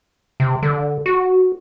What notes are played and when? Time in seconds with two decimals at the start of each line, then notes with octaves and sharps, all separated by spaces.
0.40 C3
0.63 D3
1.06 F#4